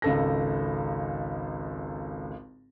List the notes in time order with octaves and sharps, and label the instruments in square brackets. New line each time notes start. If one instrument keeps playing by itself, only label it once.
[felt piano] G#1 C#2 A4 A#6